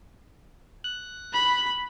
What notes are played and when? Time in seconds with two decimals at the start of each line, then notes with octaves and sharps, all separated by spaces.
0.84 F#6
1.33 B5